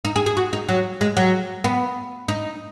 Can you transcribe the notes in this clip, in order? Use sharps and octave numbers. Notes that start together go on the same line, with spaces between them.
D#4
G#4
G#4
F#4
D#4
F#3
G#3
F#3
B3
D#4